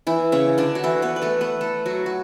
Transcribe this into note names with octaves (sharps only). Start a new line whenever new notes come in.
E3 E4
C#3 C#4
D3 D4
F#4
E3 E4
B3 B4
B4
A3 A4
B3 B4
A3 A4
F#3 F#4
F#4